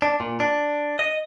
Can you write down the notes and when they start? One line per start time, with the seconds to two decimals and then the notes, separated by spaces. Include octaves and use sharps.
0.02 D4
0.20 A#2
0.40 D4
0.99 D#5